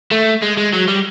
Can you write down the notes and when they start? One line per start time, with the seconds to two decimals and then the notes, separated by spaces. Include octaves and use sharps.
0.11 A3
0.42 G#3
0.57 G#3
0.73 F#3
0.88 G3